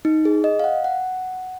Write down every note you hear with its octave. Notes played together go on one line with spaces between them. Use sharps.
D#4
G#4
D#5
F5
F#5
F#5